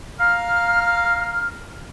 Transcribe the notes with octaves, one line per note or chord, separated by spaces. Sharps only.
F5 A#5 F6